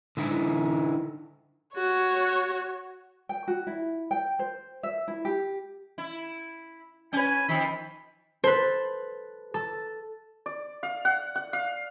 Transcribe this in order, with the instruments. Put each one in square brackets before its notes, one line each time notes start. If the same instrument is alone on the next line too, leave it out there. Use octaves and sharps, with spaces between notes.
[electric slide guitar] D3 D#4 E4
[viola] F#4 [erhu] C#5
[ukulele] G5
F#4
E4
G5
C5
E5
E4
G4
[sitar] E4
[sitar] C#4 B4 [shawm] G#5
[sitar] D#3 F3 [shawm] B5
[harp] A4 B4 [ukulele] C5
[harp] A4
[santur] D5
F5
F#5
F#5
F5